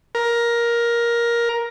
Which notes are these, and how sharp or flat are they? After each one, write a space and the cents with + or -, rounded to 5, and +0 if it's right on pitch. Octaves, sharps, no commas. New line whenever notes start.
A#4 +15